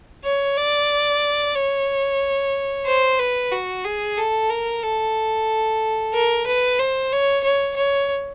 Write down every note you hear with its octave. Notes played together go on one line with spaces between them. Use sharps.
C#5
D5
C#5
C5
B4
F#4
G#4
A4
A#4
A4
A#4
B4
C5
C#5
C#5
C#5